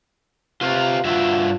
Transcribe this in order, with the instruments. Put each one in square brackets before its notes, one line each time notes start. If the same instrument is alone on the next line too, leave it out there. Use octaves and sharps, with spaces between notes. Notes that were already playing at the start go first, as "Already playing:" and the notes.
[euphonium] C3 [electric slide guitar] F4 B4 F5
[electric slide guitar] G2 F#4 E5 [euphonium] F4